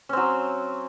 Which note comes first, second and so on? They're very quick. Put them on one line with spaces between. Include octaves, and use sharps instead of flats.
C#4 C4 F#3